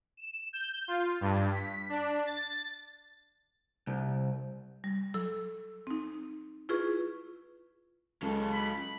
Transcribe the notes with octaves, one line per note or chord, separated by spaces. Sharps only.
E7
G6
F4
G2
B6
D4
A6
C2
G3
F#3 A4 E6
C4 D#4
E4 F4 G#4 B4 C#6
C#2 F#3 G#3 A4
B5